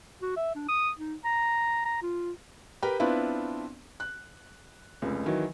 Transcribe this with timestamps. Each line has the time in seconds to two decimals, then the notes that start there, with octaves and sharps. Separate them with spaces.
0.22 F#4
0.37 E5
0.55 D4
0.69 D#6
0.98 D#4
1.25 A#5
1.85 A#5
2.02 F4
2.82 G4 A#4 B4 G5
3.00 B3 C4 D4 E4 F4 B4
4.00 F#6
5.02 F1 C#2
5.26 D#3 E3 F#3